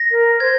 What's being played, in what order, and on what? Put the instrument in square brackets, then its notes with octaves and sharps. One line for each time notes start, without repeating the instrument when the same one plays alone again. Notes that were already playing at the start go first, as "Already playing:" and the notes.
Already playing: [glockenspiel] A#6
[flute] A#4
[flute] C5 [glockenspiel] G#6